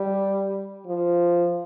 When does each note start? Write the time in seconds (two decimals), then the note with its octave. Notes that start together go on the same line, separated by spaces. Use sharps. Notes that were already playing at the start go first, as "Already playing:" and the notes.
Already playing: G3
0.86 F3